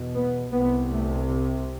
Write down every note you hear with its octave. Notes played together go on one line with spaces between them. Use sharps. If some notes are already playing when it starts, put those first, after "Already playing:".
Already playing: E2 B2
B3
C2 C3 B3
A3